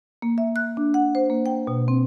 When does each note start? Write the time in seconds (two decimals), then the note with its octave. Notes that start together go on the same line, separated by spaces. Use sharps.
0.22 A#3
0.38 E5
0.56 F#6
0.77 D4
0.94 F#5
1.15 C5
1.30 A#3
1.46 G5
1.67 B2
1.88 C4